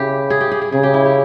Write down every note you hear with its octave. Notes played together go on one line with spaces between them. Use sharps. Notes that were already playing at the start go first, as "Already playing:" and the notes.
Already playing: C#3 E4 G4
G#4
G4
G#4
G#4
C#3 G#4
G4
E4
G4